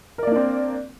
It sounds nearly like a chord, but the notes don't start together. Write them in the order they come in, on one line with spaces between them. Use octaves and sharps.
A#4 D5 A#3 D4 C4